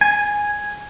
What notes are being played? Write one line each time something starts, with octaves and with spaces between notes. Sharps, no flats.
G#5